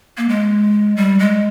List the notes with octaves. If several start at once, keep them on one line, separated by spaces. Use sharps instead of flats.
A#3
G#3
G3
G#3